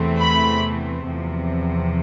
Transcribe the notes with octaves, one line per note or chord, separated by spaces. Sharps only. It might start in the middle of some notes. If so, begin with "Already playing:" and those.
Already playing: E2 C3 E3 A3 C4
B5
E2 C3 F3